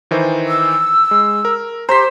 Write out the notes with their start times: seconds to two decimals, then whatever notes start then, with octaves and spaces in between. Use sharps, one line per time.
0.11 D#3 E3 C5
0.48 E6
1.11 G#3
1.45 A#4
1.89 G4 C5 A#5 C6 B6